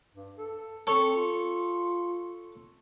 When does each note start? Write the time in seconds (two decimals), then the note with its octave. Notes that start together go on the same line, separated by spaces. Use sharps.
0.14 G2
0.38 A4
0.87 C4 A4 C#5
1.16 F4